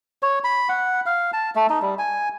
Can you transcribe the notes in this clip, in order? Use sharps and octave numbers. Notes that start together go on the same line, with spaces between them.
C#5
B5
F#5
F5
A5
A3
D#4
G3
G#5